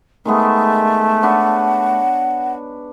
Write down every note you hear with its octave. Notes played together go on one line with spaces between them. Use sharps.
D#3 G#3 A3 B3
D4 B4 C#5 F#5